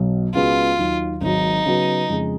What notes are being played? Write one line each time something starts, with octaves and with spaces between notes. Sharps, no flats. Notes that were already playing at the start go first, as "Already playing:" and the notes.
Already playing: B1 B2 F#3
C#2 C#3 G#3 B3 F4 F#4
D#2 D#3 F#3
G#1 G#2 D#3 F#3 D#4
C#3 F#3 B3 F#4 B4
F2 C#3 G#3